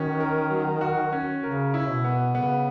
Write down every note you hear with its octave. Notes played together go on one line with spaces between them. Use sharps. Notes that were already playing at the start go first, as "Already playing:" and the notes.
Already playing: D#3 C#4 F#4
A#4
F#3
F#4
C#4
C#3 A#4
C#3 E4
B2
B3
C#3 B3